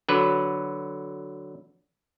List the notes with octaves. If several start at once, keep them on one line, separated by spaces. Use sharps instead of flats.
D3 F#3 B4